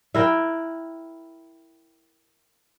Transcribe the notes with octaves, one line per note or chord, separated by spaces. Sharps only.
E4 A#4 G5